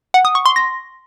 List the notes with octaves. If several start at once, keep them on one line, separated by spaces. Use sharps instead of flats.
F#5
D#6
C#6
C6
A#6